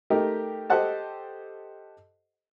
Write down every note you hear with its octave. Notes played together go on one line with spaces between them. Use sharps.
A3 D#4 G4 A#4
G4 A4 C5 D#5 F#5 A5